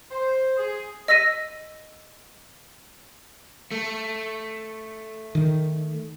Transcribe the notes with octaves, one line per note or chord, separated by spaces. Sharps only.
C5
G#4
D#5 E6 A#6 B6 D#7
A3
D#3